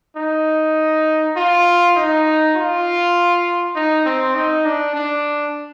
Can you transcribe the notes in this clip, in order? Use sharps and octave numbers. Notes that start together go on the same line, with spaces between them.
D#4
F4
D#4
F4
D#4
C4
D#4
D4
D4